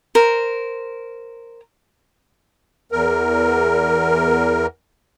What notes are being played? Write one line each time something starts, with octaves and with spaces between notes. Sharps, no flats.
A#4 C5
E2 A#4